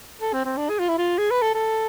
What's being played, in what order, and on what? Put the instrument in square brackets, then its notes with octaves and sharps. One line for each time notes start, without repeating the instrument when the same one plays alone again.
[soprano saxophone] A4
C4
C4
D4
G#4
F4
E4
F4
G#4
B4
A4
A4